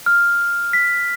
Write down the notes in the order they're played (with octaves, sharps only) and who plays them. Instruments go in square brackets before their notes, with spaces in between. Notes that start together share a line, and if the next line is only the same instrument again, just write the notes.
[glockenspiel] F6
B6